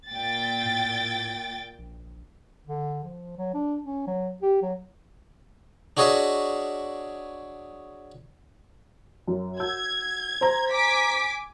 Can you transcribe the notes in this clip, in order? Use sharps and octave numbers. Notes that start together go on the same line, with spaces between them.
A#2 G5 A6
A2
A#1
D3
F3
F#3
D4
C#4
F#3
G4
F#3
D4 F#4 G#4 C#5 D#5 E5
F#2
F#4 E6 G6 G#6
C5 A#5
G#5 D6 B6